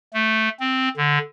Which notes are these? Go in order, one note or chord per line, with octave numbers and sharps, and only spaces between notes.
A3
C4
D3